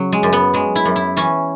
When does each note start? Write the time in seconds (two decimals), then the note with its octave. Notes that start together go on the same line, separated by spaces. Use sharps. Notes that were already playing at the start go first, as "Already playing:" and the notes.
Already playing: C#3 F#3
0.12 G#3
0.23 F#2
0.33 B3
0.54 F#3 G#3
0.76 E4
0.85 F#2
0.96 E4
1.16 E3 C#4